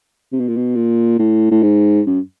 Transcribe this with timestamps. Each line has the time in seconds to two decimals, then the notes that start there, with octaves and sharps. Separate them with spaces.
0.32 C3
0.40 B2
0.48 A#2
0.56 B2
0.76 A#2
1.19 A2
1.51 A2
1.62 G#2
2.06 F#2